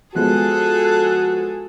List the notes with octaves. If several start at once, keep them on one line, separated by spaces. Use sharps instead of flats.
F3 G#3 B3 F#4 G#4 A4 F#6